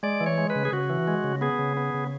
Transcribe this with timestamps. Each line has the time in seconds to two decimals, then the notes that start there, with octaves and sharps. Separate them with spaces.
0.03 G#3 D5
0.20 E3
0.26 C#5
0.38 G#3
0.50 B4
0.55 C#3
0.65 G#4
0.72 C#3 F#4
0.90 E3
1.08 G#3
1.24 C#3
1.41 B3 G#4
1.59 C#3
1.77 B3
1.94 C#3